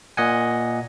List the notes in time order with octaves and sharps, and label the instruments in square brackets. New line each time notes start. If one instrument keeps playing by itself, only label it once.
[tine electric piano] A#2 D#5 F#5 G#5